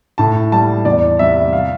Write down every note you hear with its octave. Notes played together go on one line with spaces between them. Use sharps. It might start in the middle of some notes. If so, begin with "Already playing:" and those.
A2 A5
G3 A5
E2 D5
C3 G3 E5
F5